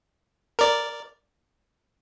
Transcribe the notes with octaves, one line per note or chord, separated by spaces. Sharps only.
A#4 D5